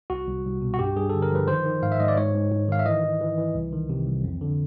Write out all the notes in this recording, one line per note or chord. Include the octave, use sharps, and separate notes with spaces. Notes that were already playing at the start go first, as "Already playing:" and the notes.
C2 F#4
C2
C2
B2
F#4
G2 G4
G2 G#4
D3 A4
A#4
F3 B4
D#3 C5
D#3
G#2 F5
E5
G#2 D#5
D5
G#2 C#5
G#2
G#2
D#3 F5
E5
E3 D#5
E3
E3
E3
C2
D#3
C3
C2
F2
D3